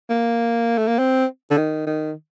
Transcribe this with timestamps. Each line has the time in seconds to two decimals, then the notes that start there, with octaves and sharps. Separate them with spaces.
0.09 A#3
0.78 A3
0.88 A#3
0.99 C4
1.50 D3
1.57 D#3
1.87 D#3